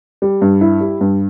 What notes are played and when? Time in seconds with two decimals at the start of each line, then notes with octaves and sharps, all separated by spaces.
0.22 G3
0.42 G2
0.61 E4
0.81 G3
1.01 G2